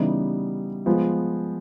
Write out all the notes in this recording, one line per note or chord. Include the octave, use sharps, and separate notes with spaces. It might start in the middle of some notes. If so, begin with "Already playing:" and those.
Already playing: C#3 E3 G3 B3 D#4
F3 G#3 B3